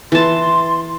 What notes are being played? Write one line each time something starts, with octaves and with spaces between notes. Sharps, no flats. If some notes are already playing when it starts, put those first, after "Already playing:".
E3 A5 C6